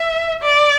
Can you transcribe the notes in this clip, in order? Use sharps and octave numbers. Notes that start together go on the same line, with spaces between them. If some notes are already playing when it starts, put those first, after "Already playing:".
Already playing: E5
D5